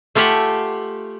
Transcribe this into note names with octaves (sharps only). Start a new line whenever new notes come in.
A3 F4 G4 E5 F#5 G#5